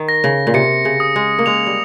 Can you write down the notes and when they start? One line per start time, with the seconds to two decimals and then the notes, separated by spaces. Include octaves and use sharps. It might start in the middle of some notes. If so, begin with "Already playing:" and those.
Already playing: D#3
0.09 A#6
0.24 C#3
0.47 A#2
0.54 C3 C#7
0.85 C#3
1.00 D#6
1.16 G#3
1.39 A#3
1.46 G#3 F7
1.67 G3